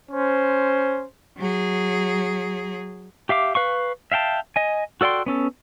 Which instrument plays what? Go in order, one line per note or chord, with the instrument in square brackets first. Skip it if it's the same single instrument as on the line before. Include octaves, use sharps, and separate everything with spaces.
[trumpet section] C#4 C5
[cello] F#3 G#4
[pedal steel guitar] G4 E5 F5 D6
B4 F5 C#6
E5 F5 G5 A5
D#5 G#5
F#4 A4 D5 G5 C6
B3 C#4 A4